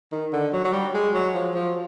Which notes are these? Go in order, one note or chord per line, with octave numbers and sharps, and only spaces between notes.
D#3
D3
F#3
F#3
G3
G#3
F#3
F3
F3